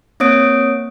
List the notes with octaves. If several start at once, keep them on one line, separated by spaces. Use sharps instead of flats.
A#3 C4 C#5 D#6 D7